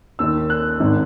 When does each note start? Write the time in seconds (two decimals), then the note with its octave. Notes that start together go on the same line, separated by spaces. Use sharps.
0.19 D#2 D#3 E6
0.50 F#6
0.80 G#1 G#2 D#3